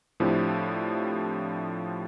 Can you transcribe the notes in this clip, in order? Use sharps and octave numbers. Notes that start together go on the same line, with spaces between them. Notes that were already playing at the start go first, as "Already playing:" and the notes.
A2 F3 C4 D4 E4 G4